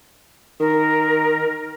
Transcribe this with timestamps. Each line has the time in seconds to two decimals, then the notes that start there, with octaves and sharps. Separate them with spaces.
0.60 D#3 A#4